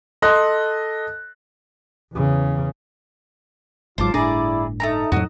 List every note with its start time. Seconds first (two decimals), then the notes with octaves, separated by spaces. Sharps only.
0.22 A4 D#5 C6 F#6
2.13 E2 C#3
3.98 G#1 G#2 F#3 F4 C5 A5 D6
4.14 G1 A2 D4 E4 G#4 D5 A#5
4.80 A3 C4 D#4 A#5
5.12 F2 A2 F#3 F#4 D#6